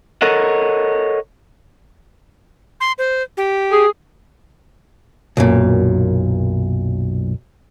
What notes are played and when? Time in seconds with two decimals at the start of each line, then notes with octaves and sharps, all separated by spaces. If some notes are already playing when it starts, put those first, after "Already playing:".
0.22 A4 A#4 C#5 D#5 F#5
2.80 C6
2.98 C5
3.37 G4
3.70 G#4
5.37 B1 F#2 A#2